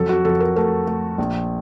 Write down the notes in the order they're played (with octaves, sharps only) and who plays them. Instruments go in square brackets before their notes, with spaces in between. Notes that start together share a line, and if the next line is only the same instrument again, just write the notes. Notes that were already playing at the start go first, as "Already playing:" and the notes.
Already playing: [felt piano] F2 F#3 A4
F#4
F2 A4
A#4
A3 A#4
A3
A#1